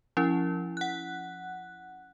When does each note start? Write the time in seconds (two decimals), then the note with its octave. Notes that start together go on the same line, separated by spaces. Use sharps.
0.17 F3 C#4 E4
0.77 F#5 F#6